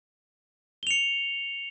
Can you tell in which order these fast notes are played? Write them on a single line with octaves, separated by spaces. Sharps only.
G7 F7 C#7